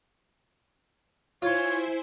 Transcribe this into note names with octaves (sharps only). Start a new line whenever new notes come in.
E4 F4 C5 C#5 G#5 C6